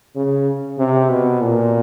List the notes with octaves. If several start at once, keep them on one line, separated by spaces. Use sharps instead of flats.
C#3
C3
B2
A#2